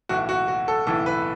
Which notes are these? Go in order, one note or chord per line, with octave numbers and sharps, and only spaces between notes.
B1 A2 E3 F#4
F#4
F#4
A4
B1 A2 E3 A4
B4